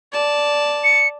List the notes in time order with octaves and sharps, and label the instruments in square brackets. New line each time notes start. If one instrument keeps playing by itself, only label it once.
[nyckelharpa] D5 A5
[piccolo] C#7